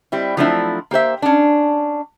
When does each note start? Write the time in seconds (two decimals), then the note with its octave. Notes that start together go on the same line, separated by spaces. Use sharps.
0.12 G3 C4 E4
0.37 F3 F#3 A3 C4 D4 E4
0.91 A#3 G4 C5 E5
1.22 C#4 D4